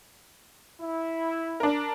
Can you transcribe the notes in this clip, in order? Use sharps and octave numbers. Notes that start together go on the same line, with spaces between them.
E4
D4 A#4